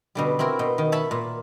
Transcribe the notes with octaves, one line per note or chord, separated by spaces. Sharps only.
B2 D3 G3
C4 E4 F#4 A#4
B2
D#3
C#5 E5 A5 B5
A#2